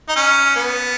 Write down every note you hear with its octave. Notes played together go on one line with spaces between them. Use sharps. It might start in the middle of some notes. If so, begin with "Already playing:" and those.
D#4
C#4
B3